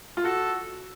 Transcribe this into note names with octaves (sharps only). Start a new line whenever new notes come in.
F4
F#4 A4